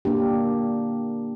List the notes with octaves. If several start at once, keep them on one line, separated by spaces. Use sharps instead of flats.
A#3 D4 G4